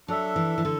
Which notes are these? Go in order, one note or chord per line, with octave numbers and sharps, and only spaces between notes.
F#3 D4 A4 E5
E3
E3
D3 A4